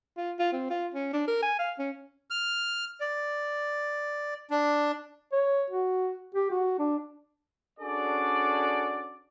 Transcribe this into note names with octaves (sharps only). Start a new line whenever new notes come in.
F4
F4
C4
F4
C#4
D4
A#4
G#5
F5
C#4
F6
D5
D4
C#5
F#4
G4
F#4
D4
C#4 D4 F#4 G#4 A4 D5